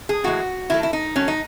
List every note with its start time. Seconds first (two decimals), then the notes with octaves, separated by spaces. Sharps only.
0.09 G#4
0.24 A2 E3 G#3 F#4
0.70 D#3 F#3 A3 E4
0.83 E4
0.93 D#4
1.16 D#3 F#3 A3 C#4
1.28 D#4